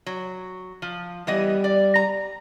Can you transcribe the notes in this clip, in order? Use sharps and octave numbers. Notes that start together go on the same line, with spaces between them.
F#3
F3
E3 G3 B3 D#5
D5
A#5